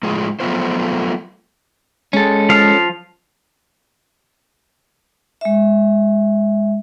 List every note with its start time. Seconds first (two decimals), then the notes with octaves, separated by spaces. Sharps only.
0.03 A2 F3 G#3
0.40 F3 F#3 A3 B3 F4 C5
2.13 G#3 C#4 A4
2.49 F3 F5
5.41 G#3 E5